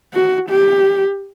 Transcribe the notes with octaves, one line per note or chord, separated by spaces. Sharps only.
F#4
G4